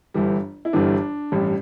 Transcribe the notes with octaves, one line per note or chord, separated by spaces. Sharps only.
G1 G2 E3 G3
E4
G1 G2 E3 G3 D4
A1 G2 G3